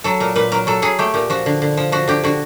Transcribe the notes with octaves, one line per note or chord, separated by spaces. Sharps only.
F#3 A4
A#2 A#4
A#2 B4
F#3 A#4
F#3 A4
F#3 G#4
A3 G4
A#2 G4
F3 F#4
D3
D3
F3
F3 F#4
D3 G4
D3 F#4